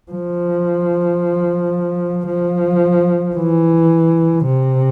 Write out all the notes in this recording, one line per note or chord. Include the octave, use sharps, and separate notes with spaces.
F3
F3
E3
C3